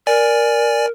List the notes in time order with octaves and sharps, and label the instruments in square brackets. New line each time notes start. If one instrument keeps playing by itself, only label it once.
[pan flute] A#4 [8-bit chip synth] D5 G#5